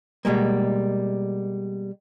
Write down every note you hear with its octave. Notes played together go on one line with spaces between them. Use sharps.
B2 G3 G#3 A#3